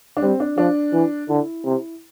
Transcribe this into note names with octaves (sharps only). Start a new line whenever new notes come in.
D4
G3 C4
D4
F3 D4
E3
D3 E4
C3